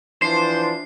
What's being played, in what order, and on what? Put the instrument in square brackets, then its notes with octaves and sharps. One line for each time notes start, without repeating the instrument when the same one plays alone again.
[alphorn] E3 [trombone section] F3 D4 [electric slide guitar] C5 [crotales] C7